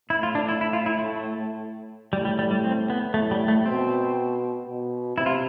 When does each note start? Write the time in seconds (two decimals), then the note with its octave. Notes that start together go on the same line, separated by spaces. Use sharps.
0.09 A2 E4
0.23 F4
0.35 D4
0.48 E4
0.61 E4
0.73 F4
0.86 E4
0.99 A3
2.13 A2 G3
2.25 G3
2.39 G3
2.51 G3
2.64 C4
2.90 B3
3.14 A2 A3
3.31 G3
3.48 A3
3.65 B2 C4
4.67 B2
5.17 C3 E4
5.26 F4